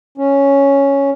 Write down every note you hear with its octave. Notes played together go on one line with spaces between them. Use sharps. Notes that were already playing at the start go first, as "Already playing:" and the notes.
C#4